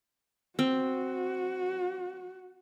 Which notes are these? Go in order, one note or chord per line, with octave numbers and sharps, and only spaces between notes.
C4 F#4